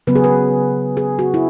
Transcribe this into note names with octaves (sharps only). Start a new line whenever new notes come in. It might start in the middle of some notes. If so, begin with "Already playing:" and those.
C#3 F#3 B3 B4
G#4
B4
G#4
F#4
E4